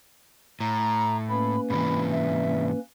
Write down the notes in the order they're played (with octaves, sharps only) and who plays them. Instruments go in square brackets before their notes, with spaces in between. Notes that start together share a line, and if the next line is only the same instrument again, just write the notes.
[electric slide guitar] A2 [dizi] A#5
[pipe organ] A#3 C#4 B4 [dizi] B5
[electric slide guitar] G#2 C3 E3 [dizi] B5
[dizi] E5